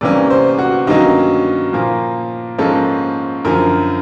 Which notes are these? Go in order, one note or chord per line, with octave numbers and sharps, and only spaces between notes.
C3 E3 G3 A#3 C#4 D5
C5
F#4
G2 D#3 F#3 A#3 C#4 D#4
A#2 F3 A#3
G#2 F3 A#3 C#4 A4
F#2 D3 F3 A#4